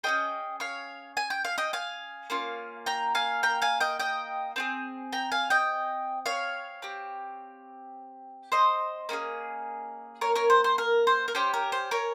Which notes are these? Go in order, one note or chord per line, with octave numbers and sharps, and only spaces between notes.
C#4 F4 G#4 D#5 G5
C#5 F5
G#5
G5
F5
D#5 G5
F5 G#5
A#3 C#4 F4
G5 A#5
F5 G#5
G5 A#5
F5 G#5
D#5 G5
D#5 G5
C4 F4 G#4
G5 A#5
F5 G#5
D#5 G5
C#5 F5
C4 G4
C5 D#5
A#3 C#4 F4 G#4
A#4 C#5
A#4 C#5
C5
C5
A#4
C5
A#4
C#4 G4 C5
A#4
C5
A#4 C#5